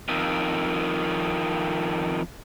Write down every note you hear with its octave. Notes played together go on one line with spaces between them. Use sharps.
F2 D#3